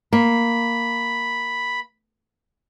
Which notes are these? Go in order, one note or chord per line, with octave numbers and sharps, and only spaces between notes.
A#3 B5